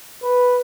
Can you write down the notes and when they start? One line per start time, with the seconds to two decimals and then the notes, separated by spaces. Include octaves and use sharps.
0.23 B4